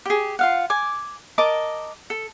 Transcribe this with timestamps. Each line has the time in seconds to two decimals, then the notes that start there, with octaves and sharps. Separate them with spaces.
0.06 G4 G#4
0.39 F4 F5 F#5
0.70 G#5 D6
1.38 A#4 D#5 A5 D6
2.10 A4